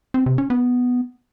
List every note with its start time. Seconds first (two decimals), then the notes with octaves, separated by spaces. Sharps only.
0.14 C4
0.26 C3
0.38 C#4
0.50 B3